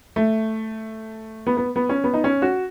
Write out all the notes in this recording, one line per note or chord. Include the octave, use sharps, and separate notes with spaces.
A3
B3
B3
B3
C#4
B3
D#4
C#4
F#4